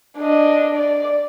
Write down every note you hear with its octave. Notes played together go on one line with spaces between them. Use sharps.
D4 D#5
D5